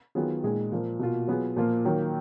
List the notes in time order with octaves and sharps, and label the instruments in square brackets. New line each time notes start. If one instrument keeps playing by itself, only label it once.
[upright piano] D#3 F#3 B3 F4 G#4
A#2 G#3 D#4 G#4
A#2 F3 A#3
B2 A#3 F4
F#3 B3 F4 G#4
A#2 F3 A#3 F4
D#3 F#3 A#3